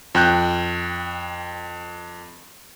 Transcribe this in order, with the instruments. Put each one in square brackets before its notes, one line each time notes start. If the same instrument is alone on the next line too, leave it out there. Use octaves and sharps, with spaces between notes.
[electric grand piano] F2 G5 F#6 G6